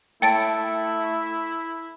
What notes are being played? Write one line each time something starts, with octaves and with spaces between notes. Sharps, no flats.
A3 E4 C#5 G5 A5 A6 D7